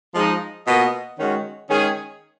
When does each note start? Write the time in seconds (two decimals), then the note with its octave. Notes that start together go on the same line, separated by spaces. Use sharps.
0.15 F3 G#3 D#4
0.66 B2 A#3 F4 B4 D#5
1.18 D#3 G#3 C#4 F#4
1.70 D#3 G#3 C#4 G#4